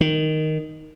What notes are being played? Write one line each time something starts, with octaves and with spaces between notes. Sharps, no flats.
D#3